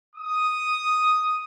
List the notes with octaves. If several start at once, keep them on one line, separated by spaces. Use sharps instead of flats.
D#6